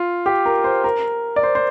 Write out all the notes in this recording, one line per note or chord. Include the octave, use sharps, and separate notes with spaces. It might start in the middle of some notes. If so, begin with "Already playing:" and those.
Already playing: F4
G4
A#4
C5
A#4
D5
C5
C5